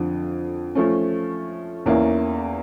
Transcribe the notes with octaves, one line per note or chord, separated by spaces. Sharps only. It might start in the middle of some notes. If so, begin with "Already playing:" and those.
Already playing: F2 D3 F3
F3 A3 C#4
E2 E3 A#3 C#4 E4